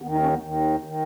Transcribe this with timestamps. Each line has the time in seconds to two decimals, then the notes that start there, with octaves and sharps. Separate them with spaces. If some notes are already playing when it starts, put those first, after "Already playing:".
0.02 D#2 D#3 B3
0.12 D#4
0.23 C#4
0.33 B3
0.43 D#2 D#3
0.84 D#3